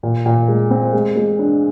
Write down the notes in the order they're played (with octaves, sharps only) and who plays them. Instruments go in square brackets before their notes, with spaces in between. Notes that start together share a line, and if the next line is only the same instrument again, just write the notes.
[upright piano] A#2
A#2
G#3
C4
G#3
G#3
D4